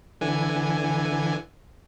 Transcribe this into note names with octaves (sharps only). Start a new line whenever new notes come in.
D3 E3 G#5